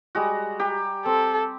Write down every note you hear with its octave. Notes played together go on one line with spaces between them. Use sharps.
G3 G#3 F#4
G4 A#5
C4 A4